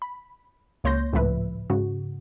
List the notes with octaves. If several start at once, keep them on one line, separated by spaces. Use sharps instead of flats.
B5
C#2 A#3 C#5 C6 G6 A#6
G#1 C#2 A2 F3 B4 E5
G#2 C#3 F#4